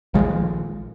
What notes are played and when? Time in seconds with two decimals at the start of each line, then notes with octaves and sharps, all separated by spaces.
0.14 A#1 D#3 F3 G#3